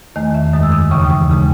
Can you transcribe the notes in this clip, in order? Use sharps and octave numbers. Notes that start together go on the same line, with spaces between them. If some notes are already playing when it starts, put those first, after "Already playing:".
E2 D#3 A3 D#5
E5
F#2 D#3 G#3 D#6
E6
D#6
D#6
D#2 C#3 E3 C#6
D#6
C#6
D#2 C#3 G#3